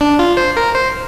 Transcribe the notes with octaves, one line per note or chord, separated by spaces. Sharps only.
D4
F4
C5
A#4
C5